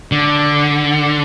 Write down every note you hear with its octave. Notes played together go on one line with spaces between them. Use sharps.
D3